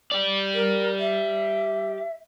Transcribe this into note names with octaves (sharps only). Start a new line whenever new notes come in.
G4 D5
A#4
E5